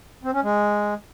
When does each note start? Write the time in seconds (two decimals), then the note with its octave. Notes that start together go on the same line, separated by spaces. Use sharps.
0.24 C4
0.33 C#4
0.43 G#3